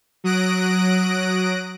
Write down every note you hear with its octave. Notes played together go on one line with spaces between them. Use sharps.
F#3 D#6 F#6 A#6 D7